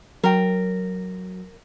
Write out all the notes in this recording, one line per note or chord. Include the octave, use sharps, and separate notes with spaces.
F#3 A#4 G5